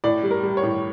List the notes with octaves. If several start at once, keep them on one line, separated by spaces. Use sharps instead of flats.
A2 D5
G3
A#4
G3
C#5
A2